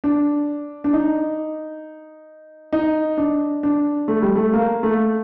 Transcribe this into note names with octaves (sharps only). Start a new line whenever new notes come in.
D4
D4
D#4
D#4
D4
D4
A3
G3
A3
A#3
A3